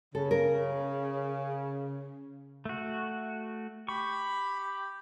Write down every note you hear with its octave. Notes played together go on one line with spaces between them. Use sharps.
C#3 A4
A#4
A3 F#4
G4 B5 C#6